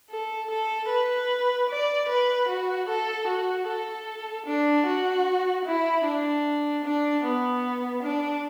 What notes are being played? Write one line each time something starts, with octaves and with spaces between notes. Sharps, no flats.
A4
A4
B4
D5
B4
F#4
A4
F#4
A4
D4
F#4
E4
D4
D4
B3
D4